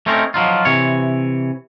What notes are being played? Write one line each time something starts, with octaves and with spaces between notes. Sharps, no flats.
A3 C4 C#4 D#4 A#4
F3 F#3 D#4 F4
C3 E3 C#5